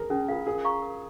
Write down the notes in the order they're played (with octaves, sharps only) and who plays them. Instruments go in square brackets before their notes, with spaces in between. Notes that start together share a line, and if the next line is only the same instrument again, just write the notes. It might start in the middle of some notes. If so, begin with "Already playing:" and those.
Already playing: [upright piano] G#4 A#4
[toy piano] C#4 [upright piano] G#4
[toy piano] F4 A#4 F5 [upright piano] G#4
[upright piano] G#4 [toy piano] A#4
[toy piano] F5 A#5 C#6
A#4